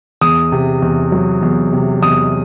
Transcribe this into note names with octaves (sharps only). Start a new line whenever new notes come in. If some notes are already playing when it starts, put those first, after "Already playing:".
E2 D#6
C3
E2
F#3
E2
C3
E2 D#6